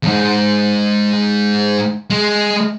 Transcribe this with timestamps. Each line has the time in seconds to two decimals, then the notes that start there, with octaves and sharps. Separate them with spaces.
0.03 E2 G#2
2.10 G#3